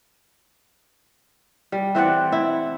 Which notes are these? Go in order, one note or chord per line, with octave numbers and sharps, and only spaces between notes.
G3
E3 C4 D5 F#5
E4